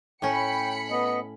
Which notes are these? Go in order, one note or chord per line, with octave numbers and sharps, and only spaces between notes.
A2 C#4 G5 B5 C#7
B3 D#5